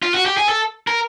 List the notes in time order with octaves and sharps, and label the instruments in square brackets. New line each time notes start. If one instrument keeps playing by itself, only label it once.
[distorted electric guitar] F4
F#4
G4
G#4
A4
A#4